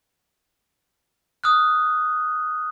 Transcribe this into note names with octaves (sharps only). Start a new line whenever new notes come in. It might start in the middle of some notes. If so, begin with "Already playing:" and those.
D#6 F6 F#6